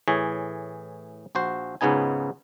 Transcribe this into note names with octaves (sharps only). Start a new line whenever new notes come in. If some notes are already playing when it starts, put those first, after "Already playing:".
A2 E3 G#4 C#5
A#1 F#4 C5
C#2 G#2 C#3 B3 D#4 G#5